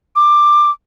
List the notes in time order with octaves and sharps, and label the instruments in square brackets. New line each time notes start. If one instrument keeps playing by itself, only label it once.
[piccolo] D6